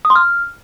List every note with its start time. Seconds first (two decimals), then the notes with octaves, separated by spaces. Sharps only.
0.05 D#6
0.10 C6
0.15 F6